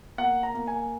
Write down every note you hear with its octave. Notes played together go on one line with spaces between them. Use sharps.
A#3 F#5
A#5
A#3
G#5